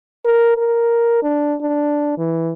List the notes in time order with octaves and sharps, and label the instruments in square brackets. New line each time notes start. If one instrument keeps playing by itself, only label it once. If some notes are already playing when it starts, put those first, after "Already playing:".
[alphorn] A#4
A#4
D4
D4
E3